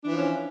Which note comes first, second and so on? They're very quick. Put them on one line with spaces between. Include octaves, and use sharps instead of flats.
D4 E3 F3 C#4